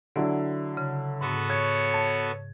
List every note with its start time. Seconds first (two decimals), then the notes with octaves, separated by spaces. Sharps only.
0.16 D3 F#3 E4 D5
0.77 C#3
1.21 G#2 B3 F#4 A4
1.50 C#5 G#6
1.94 A5